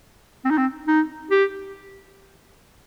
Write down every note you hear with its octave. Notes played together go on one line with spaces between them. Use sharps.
C4
D#4
C4
D#4
G4